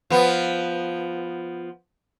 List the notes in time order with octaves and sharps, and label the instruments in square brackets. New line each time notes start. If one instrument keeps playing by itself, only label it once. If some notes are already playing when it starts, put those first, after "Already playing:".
[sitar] F3 B3